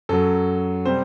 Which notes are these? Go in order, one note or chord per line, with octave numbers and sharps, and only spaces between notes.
F#2 F#3 A4
C3 G3 C5